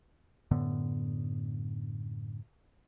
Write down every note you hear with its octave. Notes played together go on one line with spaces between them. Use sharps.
F#2 A2 D3 B3